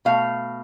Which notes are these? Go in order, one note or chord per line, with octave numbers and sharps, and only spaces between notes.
B2 A3 F5